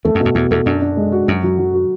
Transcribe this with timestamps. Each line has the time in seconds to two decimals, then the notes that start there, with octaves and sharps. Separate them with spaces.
0.05 E2 A3
0.15 F#2
0.20 B2
0.25 F#2
0.35 E2 B2
0.51 E2 A4
0.66 F#2 D4
0.82 D4
0.97 G#3
1.12 F#4
1.28 F#2 F#3
1.43 F#3
1.58 F#3
1.74 F#4